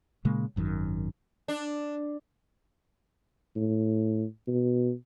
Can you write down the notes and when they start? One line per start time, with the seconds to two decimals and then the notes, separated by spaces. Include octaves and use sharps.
0.25 A#2 C#3 G#3 A#3
0.56 G#1 F#2 A#2 D#3
1.48 D4
3.56 A2
4.48 B2